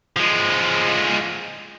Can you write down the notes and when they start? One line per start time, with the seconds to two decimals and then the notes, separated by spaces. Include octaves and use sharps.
0.17 F3 G#3